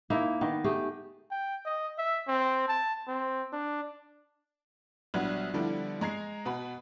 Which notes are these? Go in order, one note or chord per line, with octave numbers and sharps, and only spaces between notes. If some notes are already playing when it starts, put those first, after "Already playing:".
A#3 D#4 E4
D#3 B3
A3 G4 G#4
G5
D#5
E5
C4
A5
C4
D4
A#1 F#3 G3 B3 G#6
D3 F3 G3 B3 D4 E4
G#3 A#5 G#6 C7
B2 B3 B5